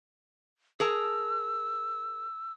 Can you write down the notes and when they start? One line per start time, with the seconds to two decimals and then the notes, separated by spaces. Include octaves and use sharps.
0.80 G#4 A#4 A5 E6